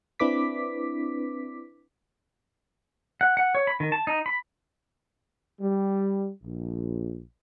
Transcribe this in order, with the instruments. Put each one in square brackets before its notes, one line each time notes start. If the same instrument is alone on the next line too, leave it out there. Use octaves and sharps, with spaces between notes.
[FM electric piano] C4 D4 E4 B4 D6 B6
[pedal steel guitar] F#5
F#5
C#5
B5
D#3
A5
D#4
B5
[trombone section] G3
A#1